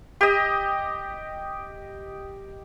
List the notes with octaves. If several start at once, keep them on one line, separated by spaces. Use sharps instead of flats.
G4 D#5